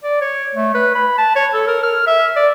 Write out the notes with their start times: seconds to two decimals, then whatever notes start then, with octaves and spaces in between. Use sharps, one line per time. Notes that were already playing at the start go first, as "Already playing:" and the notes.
0.03 D5
0.21 C#5
0.55 A3
0.74 B4
0.95 B5
1.18 A5
1.36 C#5
1.54 A4
1.67 A#4
1.83 F6
2.07 E5
2.36 D5